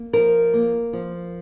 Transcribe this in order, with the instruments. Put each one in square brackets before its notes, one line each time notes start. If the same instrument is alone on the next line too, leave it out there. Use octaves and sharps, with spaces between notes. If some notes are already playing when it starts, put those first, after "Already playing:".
Already playing: [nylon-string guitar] A#3
F3 A#4
A#3
F3